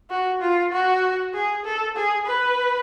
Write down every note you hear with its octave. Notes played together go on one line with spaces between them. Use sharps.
F#4
F4
F#4
G#4
A4
G#4
B4